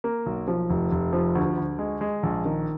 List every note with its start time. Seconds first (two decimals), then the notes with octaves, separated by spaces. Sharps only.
0.04 A#3
0.26 B1
0.48 F3
0.70 F1
0.92 F1
1.13 F3
1.35 D2
1.57 D2
1.79 G#3
2.01 G#3
2.23 A#1
2.45 D#3